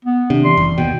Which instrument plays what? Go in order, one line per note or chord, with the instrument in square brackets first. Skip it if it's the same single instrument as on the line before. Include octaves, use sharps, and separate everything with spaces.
[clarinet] B3
[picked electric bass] C3 [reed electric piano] D#3 D4
[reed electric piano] C2 E3 D5 [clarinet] C6
[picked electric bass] F#1
[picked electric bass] D#2 B2 [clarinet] G5